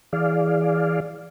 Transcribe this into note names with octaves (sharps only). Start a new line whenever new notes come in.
E3 G#4 D5 F5